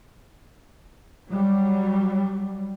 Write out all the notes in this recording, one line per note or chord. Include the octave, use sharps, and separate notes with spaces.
F#3 G3